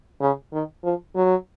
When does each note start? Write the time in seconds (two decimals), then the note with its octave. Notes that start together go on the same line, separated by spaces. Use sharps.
0.21 C#3
0.52 D#3
0.84 F3
1.16 F#3